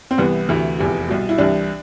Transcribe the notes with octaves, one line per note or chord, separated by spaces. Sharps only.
C4
C2 C3 E3 B3
D2 C3 E3
F1 E2 C3
C2 B2
E4
C2 C3 E3 D4